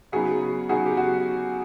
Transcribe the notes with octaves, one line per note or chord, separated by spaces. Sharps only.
C#3 F#3 B3 D#4 F#4 G#4
C#3 F#3 B3 D#4 F#4 G#4
G4
F#4